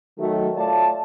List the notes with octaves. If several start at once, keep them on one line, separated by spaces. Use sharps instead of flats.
D#3 F#3 A3
A3 F4 C#5 D5 F5 A5